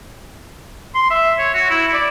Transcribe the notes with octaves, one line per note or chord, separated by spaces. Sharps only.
C6
E5
C#5
F#4
E4
D5